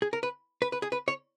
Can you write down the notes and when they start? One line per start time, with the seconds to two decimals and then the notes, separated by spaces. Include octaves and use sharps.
0.02 G#4
0.13 A#4
0.23 B4
0.62 B4
0.72 B4
0.82 G#4
0.92 B4
1.08 C#5